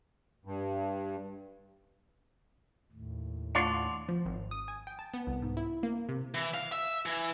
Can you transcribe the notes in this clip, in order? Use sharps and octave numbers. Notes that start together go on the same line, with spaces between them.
G2
D#2 A2
A3 D4 F4 C#5 F#5 C6 D6 F7
F3
G#1
D#6
G#5
G5
A5
B3
C2
G#2
E4
A#3
C3
E3
F5
E5
E3